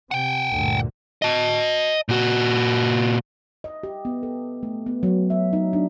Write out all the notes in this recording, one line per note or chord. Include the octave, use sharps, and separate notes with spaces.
C3 F#5 G5
D2 G2 A#2
D#5 A5
A#2 F#4
D#5
G4
B3
A4
A3
B3
F#3
E5
D#4
D4